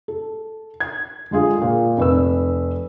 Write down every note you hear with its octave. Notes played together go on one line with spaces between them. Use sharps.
A4
G#6
D3 G#3 F4 G#4
A#2
F1 B4 E6